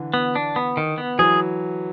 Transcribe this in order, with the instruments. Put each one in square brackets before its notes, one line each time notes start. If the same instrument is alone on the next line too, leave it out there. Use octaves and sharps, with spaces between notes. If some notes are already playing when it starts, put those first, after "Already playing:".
Already playing: [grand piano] D3 E3
[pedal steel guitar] B3
D4
B3
D#3
B3
[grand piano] E3 F#3 [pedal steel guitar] G#4